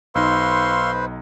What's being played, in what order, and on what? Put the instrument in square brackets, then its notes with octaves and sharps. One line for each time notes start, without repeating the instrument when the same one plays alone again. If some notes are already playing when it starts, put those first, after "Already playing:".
[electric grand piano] B1 D#4 [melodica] B4 C5 [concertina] F5 C#6 E6 [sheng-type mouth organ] C6